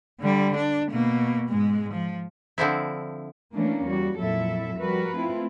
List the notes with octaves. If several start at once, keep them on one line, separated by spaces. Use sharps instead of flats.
D3 G3
D4
B2 A#3
G#2 G#3
F3
D3 F3 C4 E4
E3 A3 A#3 C#4 D4
E2 G3 F#4
F2 A#2 F#3 E4 A4 E5
F3 G3 F#4 A#4 B4
A3 C4 E4 F4